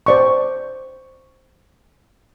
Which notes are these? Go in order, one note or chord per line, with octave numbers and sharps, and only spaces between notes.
C5 D5 C#6